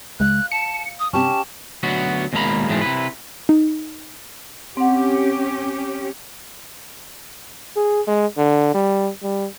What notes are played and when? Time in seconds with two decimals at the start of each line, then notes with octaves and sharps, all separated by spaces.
0.20 C#2 G#3 F5 F#6
0.52 A5 C#7
0.99 D#6
1.13 G2 C3 C#4 G4 A5
1.83 D2 F#3 B3 F#4
2.33 D#2 B2 G#3 A#3 A#5 B5
2.68 G#2 B2 E3 G#3 A3 C4
2.82 C3 E4 B4
3.49 D#4
4.77 C4 C#4 G4 F#5
7.77 G#4
8.07 G#3
8.37 D3
8.75 G3
9.23 G3